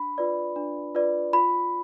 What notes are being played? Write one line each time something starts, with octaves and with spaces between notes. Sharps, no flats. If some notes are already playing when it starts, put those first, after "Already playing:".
Already playing: D4 B5
F4 B4 D5
D4
F4 B4 D5
F4 B5